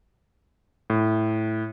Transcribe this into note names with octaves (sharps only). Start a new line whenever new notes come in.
A2